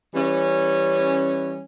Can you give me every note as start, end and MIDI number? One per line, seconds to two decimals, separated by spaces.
0.15 1.63 52
0.15 1.63 55
0.15 1.63 61